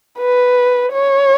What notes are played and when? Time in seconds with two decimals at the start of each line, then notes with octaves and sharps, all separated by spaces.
0.19 B4
0.93 C#5